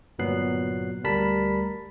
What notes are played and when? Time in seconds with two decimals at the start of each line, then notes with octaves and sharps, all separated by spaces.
0.19 G1 A#2 F#3 B3 F#6 C7
1.04 D2 G3 A#4 A5 B5 B6